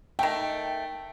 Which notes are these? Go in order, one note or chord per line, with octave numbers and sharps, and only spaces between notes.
D#3 A3 G5